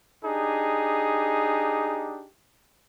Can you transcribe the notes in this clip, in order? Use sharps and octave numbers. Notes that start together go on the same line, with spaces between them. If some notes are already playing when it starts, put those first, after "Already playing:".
D4 D#4 G4 G#4